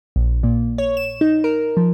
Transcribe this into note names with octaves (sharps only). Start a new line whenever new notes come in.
A#1
A#2
C#5
E7
D#4
A#4
F3